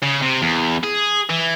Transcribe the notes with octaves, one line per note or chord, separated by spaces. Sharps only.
C#3
C3
E2
G#4
E3